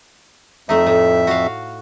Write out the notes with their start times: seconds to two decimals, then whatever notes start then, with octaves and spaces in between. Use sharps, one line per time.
0.69 F2 A3 D#4 E5
0.86 A2
1.27 F#4 F5